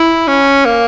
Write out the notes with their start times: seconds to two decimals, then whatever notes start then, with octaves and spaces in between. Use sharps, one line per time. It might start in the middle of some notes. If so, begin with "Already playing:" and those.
Already playing: E4
0.28 C#4
0.65 A#3